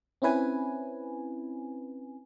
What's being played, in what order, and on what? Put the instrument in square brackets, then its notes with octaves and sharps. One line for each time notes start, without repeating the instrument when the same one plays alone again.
[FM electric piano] C4 C#4 E4 B4 G#5